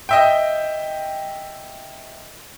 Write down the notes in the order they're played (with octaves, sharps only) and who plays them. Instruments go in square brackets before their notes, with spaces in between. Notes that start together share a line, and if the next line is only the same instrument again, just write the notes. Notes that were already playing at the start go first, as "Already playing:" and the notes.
[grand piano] D#5 E5 G5